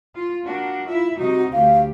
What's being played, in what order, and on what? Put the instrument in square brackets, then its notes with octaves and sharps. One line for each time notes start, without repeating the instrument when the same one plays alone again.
[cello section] F4
A#3 D4 F#4
[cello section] E4 E5 [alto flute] F4
[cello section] C3 G3 D#4 [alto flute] F#4
[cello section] D2 G4 [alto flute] F5